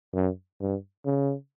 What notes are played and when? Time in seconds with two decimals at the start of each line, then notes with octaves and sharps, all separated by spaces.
0.14 F#2
0.61 G2
1.06 C#3